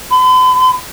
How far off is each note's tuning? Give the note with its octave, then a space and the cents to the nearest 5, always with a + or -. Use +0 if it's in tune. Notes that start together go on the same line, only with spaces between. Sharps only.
B5 +45